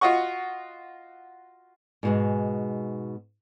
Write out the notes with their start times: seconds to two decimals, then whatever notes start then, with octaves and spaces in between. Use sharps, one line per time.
0.01 F4 F#4 D#5 F#5 C#6
2.03 G#2 B2 G#3